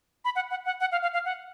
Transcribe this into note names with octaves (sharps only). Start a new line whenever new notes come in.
B5
F#5
F#5
F#5
F#5
F5
F5
F5
F#5